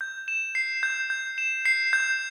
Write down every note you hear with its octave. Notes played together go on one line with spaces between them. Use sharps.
G6
E7
C7
G6
G6
E7
C7
G6